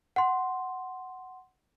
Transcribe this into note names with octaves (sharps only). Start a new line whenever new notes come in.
F#5 C6